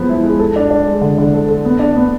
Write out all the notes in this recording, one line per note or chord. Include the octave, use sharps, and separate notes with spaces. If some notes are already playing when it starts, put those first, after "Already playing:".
Already playing: F3 G#3 B3
E4
G#3
A4
D4
D4
G#3
D3
D3
A4
A4
B3
D4
B3